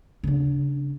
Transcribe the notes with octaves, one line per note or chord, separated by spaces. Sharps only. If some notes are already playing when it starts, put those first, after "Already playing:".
C#3 D4